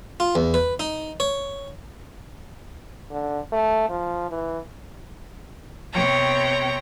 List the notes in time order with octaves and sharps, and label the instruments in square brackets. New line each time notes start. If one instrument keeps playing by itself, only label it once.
[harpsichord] F4
E2
B4
D#4
C#5
[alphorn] D3
A3
F3
E3
[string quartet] C3 B3 C#5 G5 A#5 C#6